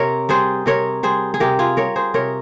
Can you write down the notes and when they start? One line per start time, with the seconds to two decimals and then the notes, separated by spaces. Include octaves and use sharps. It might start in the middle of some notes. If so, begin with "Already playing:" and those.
Already playing: C3 A#4 C#5
0.29 G3 G#4 C5
0.66 C3 A#4 C#5
1.03 G3 G#4 C5
1.34 G#4
1.40 C3 G4 A#4
1.59 F4 G#4
1.77 G3 A#4 C#5
1.96 G#4 C5
2.14 C3 A#4 C#5